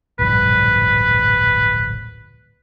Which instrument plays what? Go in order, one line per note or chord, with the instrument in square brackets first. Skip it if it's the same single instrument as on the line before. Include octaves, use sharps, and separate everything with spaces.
[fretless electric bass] D1 A#1 G2 [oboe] B4